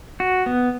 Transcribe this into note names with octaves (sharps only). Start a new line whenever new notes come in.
F#4
B3